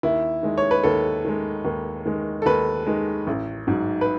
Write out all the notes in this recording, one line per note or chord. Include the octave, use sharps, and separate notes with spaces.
D#2 E4
D#3 G#3
C#5
B4
D#2 A4
D#3 G#3
D#2
D#3 G#3
A4
D#2 B4
D#3 G#3
A1
G#2 F#3
B4